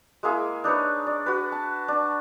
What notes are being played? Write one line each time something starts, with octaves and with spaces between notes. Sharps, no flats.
G#3 A#3 E4 G#4
D4 D#4 B4 C#5
D5
F#4 B4
A5
D4